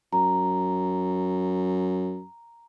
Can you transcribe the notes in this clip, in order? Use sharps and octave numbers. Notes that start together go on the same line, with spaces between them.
F#2 A#5